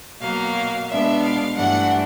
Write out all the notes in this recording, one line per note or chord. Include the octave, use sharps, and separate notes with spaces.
B2 F#3 A#3 F5
B2 G#3 B3 D4 E5
F5
G2 E3 A3 D4 F#5